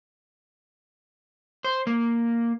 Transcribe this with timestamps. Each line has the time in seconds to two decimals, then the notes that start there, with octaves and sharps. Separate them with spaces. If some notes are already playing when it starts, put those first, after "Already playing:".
1.64 C5
1.87 A#3